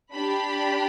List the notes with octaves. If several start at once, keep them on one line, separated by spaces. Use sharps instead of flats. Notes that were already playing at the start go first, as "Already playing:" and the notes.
D4 G4 B5